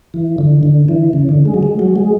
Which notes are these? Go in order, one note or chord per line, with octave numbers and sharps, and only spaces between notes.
E3
D3
D3
E3
C#3
D3
G#3
F#3
G#3
F#3
G#3